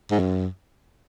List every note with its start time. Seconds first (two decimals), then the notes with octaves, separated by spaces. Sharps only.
0.11 G#2
0.20 F#2